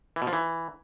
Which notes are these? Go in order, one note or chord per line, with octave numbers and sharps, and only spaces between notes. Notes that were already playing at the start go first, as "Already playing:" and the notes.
E3
B2
F3
E3